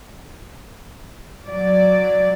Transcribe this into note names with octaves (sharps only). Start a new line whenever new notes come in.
F#3 D5